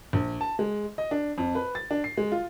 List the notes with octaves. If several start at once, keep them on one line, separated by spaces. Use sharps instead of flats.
A#1
A5
G#3
D#5
D4
F2
B4
A6
D4
C7
G#3
F4